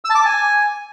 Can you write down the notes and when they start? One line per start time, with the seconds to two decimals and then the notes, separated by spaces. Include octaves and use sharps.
0.05 E6
0.10 A5
0.15 D6
0.20 A5
0.25 G#5